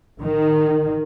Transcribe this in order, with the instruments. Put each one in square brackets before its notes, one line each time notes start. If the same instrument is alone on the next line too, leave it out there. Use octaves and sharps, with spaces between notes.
[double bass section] D#3